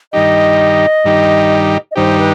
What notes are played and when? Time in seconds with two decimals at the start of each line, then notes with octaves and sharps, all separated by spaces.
0.13 G2 D#3 G3 D#4 G4 D#5
1.05 G2 D#3 G3 D#4 G4
1.91 D#5
1.96 G2 D#3 G3 D#4 G4 C5
2.19 B4